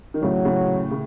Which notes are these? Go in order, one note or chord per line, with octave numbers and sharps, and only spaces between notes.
D#3
A2 C#3 F#3
A2 C#3
C#3